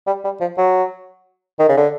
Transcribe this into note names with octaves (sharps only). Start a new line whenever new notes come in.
G3
G3
F3
F#3
D#3
C#3
D3